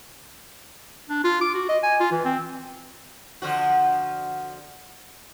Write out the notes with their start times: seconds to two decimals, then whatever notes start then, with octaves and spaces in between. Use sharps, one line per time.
1.09 D4
1.24 F4
1.41 D6
1.54 F#4
1.69 D#5
1.83 G#5
2.00 F4
2.12 E3
2.25 C4
3.42 D3 F3 F#4